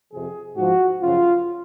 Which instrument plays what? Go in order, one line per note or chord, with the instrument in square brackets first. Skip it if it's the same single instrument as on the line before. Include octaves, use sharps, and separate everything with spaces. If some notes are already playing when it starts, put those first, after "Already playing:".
[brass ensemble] F2 C3 F3 G#4
G#2 F3 F#4
F#2 C#3 F3 F4